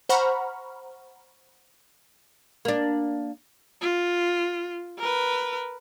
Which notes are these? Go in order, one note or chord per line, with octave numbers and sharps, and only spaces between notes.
C5 F#5 A#5 B5 C#6 F6
A#3 D4
F4
A#4 B4